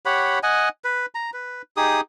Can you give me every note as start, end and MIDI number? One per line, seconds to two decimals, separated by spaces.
0.06 0.39 67
0.06 0.39 73
0.06 0.39 78
0.06 0.39 83
0.43 0.69 75
0.43 0.69 78
0.43 0.69 80
0.84 1.06 71
1.15 1.30 82
1.33 1.62 71
1.77 2.01 63
1.77 2.01 67
1.77 2.01 68
1.77 2.01 87